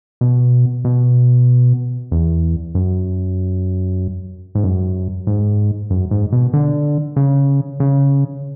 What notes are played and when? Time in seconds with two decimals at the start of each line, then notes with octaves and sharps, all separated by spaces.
0.21 B2
0.85 B2
2.12 E2
2.75 F#2
4.55 G#2
4.64 F#2
5.27 G#2
5.90 F#2
6.11 G#2
6.32 B2
6.53 D3
7.16 C#3
7.80 C#3